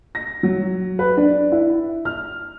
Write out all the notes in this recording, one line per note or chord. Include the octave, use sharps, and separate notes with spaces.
A#6
F#3
B4
D4
E4
F6